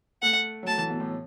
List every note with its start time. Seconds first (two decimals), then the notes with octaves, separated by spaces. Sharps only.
0.22 A3 F#5
0.63 F#3
0.67 A3 A5
0.78 E3
0.90 B2
1.00 A2